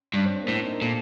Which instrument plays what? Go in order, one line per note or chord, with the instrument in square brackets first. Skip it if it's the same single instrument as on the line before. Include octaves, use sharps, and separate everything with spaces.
[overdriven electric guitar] G2 [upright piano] D4
[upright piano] C4
C4
A#3
[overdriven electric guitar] A2 [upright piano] C4
[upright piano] D4
D#4
A#4
[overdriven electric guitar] A#2 [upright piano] A4